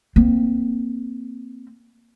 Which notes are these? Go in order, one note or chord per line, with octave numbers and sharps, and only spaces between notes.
A#3 C4